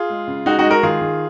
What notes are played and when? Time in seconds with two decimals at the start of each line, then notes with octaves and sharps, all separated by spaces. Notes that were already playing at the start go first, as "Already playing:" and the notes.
Already playing: F4 G#4
0.10 G#3
0.28 C#3
0.46 G#3 D#4 F#4
0.58 D#4 F#4
0.64 G#3
0.70 F#4 A#4
0.83 D#3 F4 G#4
1.01 D#3